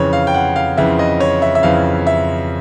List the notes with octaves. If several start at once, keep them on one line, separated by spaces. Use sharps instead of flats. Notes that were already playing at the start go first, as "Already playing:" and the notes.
Already playing: F2 C#3 E3 C#5
F5
G5
F#5
F5
F2 C#3 E3 E5
D#5
C#5
E5
E5
F2 C#3 E3 F5
E5